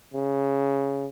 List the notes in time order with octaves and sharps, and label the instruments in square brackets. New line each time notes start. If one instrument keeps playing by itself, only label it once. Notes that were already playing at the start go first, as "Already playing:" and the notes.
[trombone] C#3